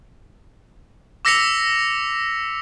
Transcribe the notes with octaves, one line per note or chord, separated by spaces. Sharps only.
D6 E6 A#6 B6 C#7 F7